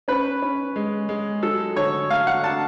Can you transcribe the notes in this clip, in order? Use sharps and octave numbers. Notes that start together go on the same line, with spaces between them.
C#4 B4
C#4
G#3
G#3
F#3 A4
D3 C#5
A3 F5
F#5
D4 A5